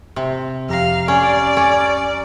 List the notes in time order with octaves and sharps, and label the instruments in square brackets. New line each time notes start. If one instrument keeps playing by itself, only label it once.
[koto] C3
[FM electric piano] F2 G4 A#5 [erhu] F5
[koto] C#4 [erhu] D5
[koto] C#4